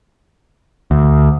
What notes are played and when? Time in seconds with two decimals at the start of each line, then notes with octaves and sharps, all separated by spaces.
0.91 D2